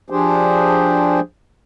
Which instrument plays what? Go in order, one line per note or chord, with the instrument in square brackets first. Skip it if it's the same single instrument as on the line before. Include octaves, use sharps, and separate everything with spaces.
[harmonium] F3 D4 G4 G#4 C5